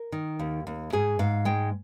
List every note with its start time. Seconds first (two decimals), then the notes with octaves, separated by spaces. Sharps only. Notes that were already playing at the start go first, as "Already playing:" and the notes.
Already playing: A#4
0.12 D#3
0.39 D#2
0.67 D#2
0.92 G#2 G#4
1.19 G#2 F5
1.45 G#3 G5